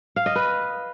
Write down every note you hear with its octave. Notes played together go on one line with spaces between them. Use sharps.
F5
D#5
B4